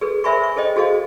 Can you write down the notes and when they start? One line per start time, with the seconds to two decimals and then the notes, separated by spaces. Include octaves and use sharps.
0.01 G#4 A4 B4
0.24 A#4 C5 E5 G#5 B5 C#6
0.44 C#6
0.56 G#4 A4 C5 D#5 G5
0.76 F#4 G#4 A4 C5 D#5 F5